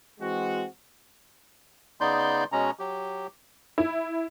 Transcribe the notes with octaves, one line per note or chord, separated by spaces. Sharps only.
E3 G#3 C4 F#4
C#3 B3 D#4 D5 C6 G6
B2 G#3 C#4 A#5
F#3 G4
E4